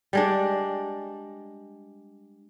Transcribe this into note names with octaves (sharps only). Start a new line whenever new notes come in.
G3 G#3 D4